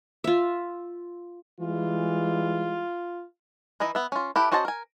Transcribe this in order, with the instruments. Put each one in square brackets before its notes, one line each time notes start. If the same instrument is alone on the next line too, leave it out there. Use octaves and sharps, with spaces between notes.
[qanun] F4 E5
[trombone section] E3 G3 G#3 [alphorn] F4
[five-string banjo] E3 D#4 E4 D#5
B3 E5
C#4 F4
E4 G4 A4 B4
C#4 F#4 C5 D#5 A5
A#4 G#5